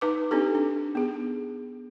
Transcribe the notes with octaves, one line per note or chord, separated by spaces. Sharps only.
D#4 B4 D6
C4 D4 D#4 G4 A4
D4
B3 G#4